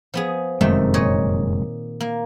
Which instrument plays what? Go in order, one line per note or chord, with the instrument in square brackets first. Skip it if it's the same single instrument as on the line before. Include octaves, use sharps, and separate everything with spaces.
[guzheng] F3 B3 G#4
[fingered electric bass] F1 F#2 G#3 [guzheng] C3 D#3 A3
[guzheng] A#2 C#5 D#5
A#3